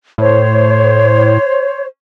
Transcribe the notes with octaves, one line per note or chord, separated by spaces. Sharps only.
A2 C5 C#5